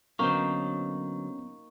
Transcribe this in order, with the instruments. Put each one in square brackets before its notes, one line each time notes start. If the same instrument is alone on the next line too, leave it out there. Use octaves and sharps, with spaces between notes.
[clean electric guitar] D3 F#3 [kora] A#3 D#4 C5 [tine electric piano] B3 C#4 [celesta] C#6